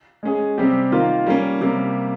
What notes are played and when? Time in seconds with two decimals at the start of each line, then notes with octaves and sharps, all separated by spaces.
0.23 G#3 C#4 G#4
0.58 C3 G3 C4 G4
0.92 D#3 A#3 F4
1.26 G3 A#3 C#4
1.61 C3 G3 A#3